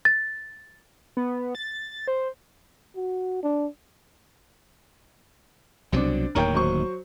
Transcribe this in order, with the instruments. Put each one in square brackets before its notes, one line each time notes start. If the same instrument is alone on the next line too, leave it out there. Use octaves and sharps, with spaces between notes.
[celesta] A6
[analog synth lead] B3
A6
C5
[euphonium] F#4
D4
[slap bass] C2 B2 F#3 [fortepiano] C4 D4
[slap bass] D1 D#2 D#3 [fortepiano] A#4 C#5 G5
[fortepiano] F#3 C5 C#6